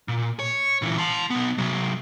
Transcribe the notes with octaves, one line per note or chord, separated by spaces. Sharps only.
A#2
C#5
A#2 E3
A5 C6
B1 B3
C3 F#3